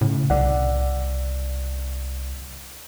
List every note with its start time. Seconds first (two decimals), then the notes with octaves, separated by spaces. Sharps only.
0.01 A2 C#3
0.30 C2 D5 F#5